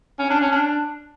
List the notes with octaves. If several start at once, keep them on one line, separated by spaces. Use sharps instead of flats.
C#4
D4
C#4
D4